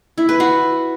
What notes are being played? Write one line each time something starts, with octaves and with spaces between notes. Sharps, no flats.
E4
B4
F#4